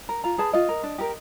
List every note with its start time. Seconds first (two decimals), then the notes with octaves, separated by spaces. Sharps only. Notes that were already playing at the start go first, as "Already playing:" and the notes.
0.09 A#4
0.24 F4 A#5
0.38 G#4 B4 A5
0.53 F4 D#5
0.69 A#4
0.83 D4
0.98 G4 A#4